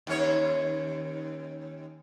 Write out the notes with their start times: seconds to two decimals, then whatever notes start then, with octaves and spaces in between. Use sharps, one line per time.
0.07 D#2 C#4 C#5